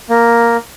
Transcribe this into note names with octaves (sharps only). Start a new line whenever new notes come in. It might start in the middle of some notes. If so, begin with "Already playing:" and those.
A#3